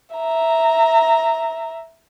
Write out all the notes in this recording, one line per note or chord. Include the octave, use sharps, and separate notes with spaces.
E5 A#5